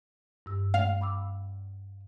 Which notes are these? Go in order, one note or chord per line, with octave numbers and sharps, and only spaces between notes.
G2 E6
F5
B5 D6 E6